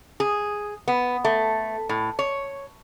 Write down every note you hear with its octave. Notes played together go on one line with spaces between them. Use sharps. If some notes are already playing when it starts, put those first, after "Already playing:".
G#4
B3
A3
A2
C#5